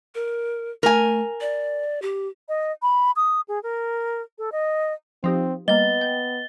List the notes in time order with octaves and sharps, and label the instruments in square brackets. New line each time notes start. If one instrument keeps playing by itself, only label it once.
[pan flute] A#4
[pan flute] A3 [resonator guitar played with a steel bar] A#4 G#5
[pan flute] D5
G4
[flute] D#5
B5
D#6
G#4
A#4
A4
D#5
[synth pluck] F3 D#4 G4 [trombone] C4
[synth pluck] G3 A#3 [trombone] B3 [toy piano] D#5 [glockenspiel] A6 G7
[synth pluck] G5